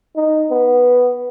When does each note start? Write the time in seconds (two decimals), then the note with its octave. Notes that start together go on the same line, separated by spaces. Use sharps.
0.16 D#4
0.50 B3